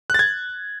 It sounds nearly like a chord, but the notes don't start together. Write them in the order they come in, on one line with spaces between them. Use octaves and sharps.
F#6 A6 G#6